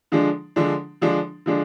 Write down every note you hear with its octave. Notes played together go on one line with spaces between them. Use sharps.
D3 F3 G#3 D4
D3 F3 G#3 D4
D3 F3 G#3 D4
D3 F3 G#3 D4